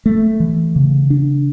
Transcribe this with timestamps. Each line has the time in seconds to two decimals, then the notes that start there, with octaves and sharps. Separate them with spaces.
0.06 A3
0.40 E3
0.76 C#3
1.10 D4